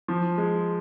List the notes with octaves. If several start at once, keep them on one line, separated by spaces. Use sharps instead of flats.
F3
G#3